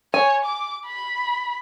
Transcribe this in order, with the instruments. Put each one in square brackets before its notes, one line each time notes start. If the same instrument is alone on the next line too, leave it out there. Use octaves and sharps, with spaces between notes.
[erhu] C#5 [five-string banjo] G#5
[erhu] D6
B5